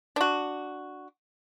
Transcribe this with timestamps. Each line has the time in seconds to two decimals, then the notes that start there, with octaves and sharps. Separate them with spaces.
0.16 D4 F#4